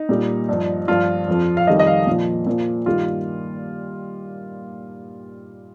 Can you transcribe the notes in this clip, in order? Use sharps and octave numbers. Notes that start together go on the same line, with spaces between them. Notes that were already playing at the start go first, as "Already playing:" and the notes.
Already playing: D#4
A#2 G3
G2 F3
G2 F3 F4
F2 F3
F5
F2 D#3 G3 D#5
D#5
F5
A#2 F3
A#2 F3
G2 D#3 G3 F4